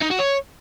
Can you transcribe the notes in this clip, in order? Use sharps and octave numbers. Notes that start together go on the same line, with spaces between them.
D#4
F#4
C#5